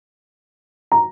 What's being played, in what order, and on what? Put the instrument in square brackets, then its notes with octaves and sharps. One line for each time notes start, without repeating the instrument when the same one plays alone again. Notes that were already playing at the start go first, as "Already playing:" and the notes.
[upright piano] A#5